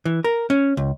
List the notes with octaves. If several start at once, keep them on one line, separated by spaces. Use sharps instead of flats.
E3
A#4
C#4
C#2